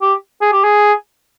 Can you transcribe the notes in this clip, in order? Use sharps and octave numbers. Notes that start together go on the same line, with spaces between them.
G4
G#4
G4
G#4